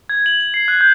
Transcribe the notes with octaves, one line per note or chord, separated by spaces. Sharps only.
G#6
F#7
F#7
C7
F#6
G6